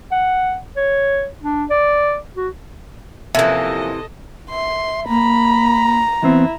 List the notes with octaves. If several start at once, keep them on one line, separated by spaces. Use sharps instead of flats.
F#5
C#5
D4
D5
F#4
C3 E3 F3 A#3 C#4 A4 D#5 E5
E5 C6
A#3 A#5 B5
E3 B3 C4 E4